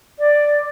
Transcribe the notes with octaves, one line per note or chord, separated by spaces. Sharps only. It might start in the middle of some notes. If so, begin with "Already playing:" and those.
D5